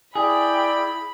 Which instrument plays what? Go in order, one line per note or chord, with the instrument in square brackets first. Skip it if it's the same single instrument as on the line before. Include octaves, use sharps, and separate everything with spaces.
[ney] E4 [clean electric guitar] G#4 [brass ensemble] D5 G5 [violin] B5